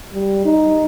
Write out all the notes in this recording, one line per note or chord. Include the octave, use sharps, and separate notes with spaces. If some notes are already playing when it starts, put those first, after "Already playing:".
G3
D#4